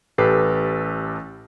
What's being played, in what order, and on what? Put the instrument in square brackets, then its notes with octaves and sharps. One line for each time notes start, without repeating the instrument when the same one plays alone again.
[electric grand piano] A1 G4 A4 B4 C7